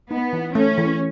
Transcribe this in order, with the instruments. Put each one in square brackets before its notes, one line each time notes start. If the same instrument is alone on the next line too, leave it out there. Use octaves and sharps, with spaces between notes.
[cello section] B3 [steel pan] D#4
[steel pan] E3
[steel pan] A3 [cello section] C#4
[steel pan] E3